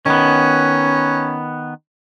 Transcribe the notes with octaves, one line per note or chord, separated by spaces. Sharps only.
D#3 B3 C#4